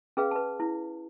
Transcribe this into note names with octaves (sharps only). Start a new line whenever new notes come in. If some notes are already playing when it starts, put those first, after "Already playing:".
C#4 G#4 B4 F5
B4 A5
E4